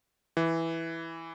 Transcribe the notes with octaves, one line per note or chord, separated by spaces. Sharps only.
E3